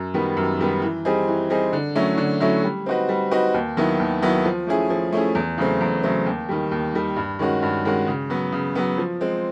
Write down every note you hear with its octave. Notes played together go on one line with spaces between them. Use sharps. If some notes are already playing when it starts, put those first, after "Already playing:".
Already playing: F#2
D#3 G3 B3
F#2
D#3 G3 B3
E3
G3 C4 D#4 G#4
E3
G3 C4 D#4 G#4
D3
F#3 A3 C#4 E4
D3
F#3 A3 C#4 E4
G3
C4 D#4 F#4 B4
G3
C4 D#4 F#4 B4
D#2
D#3 F#3 B3 E4
D#2
D#3 F#3 B3 E4
F3
A3 C#4 E4 G#4
F3
A3 C#4 E4 G#4
E2
C#3 F#3 A3 C4
E2
C#3 F#3 A3 C4
D#2
D#3 G3
D#2
D#3 G3
G2
D#3 G#3 C#4 F#4
G2
D#3 G#3 C#4 F#4
C#3
F#3 B3
C#3
F#3 B3
F3
G#3 C4